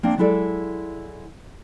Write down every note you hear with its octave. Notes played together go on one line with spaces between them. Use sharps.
A#3 C4 D4
F#3 G#3 E4 A4 D5